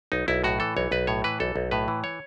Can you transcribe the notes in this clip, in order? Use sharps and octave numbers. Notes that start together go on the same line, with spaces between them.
B1 D#4
B1 E4
A2 F#4
E3 A4
B1 C#5
B1 B4
A2 C#5
E3 B4
B1 A4
B1
A2 B4
E3
C#5